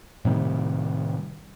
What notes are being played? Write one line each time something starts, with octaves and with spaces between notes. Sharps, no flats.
A2 C3 D#3 G3